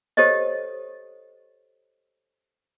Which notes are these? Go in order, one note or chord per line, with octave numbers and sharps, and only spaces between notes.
G4 A4 C5 C#5 D#5